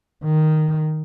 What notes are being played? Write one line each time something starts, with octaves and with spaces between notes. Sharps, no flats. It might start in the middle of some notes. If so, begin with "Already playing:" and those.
D#3